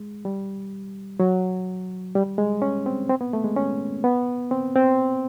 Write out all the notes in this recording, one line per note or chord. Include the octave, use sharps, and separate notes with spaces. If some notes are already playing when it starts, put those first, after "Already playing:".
Already playing: G#3
G3
F#3
G3
G#3
C#4
C4
C4
B3
A3
G#3
C#4
B3
C4
C4